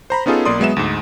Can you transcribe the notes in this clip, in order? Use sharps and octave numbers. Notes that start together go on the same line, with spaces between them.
C5 A#5 B5
B3 C#4 D#4 F4 G#4 A4
B1 A#3 D5 C6 D#6
F#3 G#3 B3 E5 E7
D2 G#2